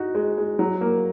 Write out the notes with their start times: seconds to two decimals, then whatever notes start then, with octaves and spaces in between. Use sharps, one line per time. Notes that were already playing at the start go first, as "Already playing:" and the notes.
Already playing: D#4 F#4
0.15 G#3
0.38 G#3
0.59 F#3
0.81 A#3